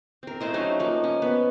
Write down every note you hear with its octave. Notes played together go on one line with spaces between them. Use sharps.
C4 A#4
A3 E4 C5 D#5
F#3 C#4 D#4
F3 A#3 D#4
C#4
B3